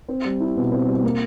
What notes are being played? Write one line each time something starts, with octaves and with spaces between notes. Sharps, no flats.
C4
G3
E4
B2
C4
G3
A#3